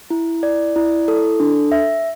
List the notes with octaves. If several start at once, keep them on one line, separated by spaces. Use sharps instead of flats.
E4
D5
E4
A4
D4
E5